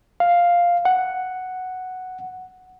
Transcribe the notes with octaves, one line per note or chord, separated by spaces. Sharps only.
F5
F#5